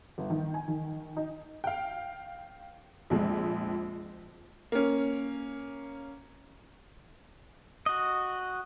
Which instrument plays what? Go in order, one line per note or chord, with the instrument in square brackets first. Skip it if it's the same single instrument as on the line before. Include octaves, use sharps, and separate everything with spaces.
[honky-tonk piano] G1
D#3
G#5
D#3
D#4
F5 G5
A#1 F2 G#3
A#3 C#4
[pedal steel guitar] F#4 D#5